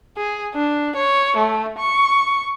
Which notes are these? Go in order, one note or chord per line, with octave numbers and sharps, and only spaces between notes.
G#4
D4
C#5
A3
C#6